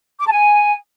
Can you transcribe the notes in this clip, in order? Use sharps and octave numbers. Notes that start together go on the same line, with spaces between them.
D6
A5
G#5